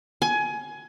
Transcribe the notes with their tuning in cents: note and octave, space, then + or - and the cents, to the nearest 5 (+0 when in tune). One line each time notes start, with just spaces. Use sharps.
G#5 +20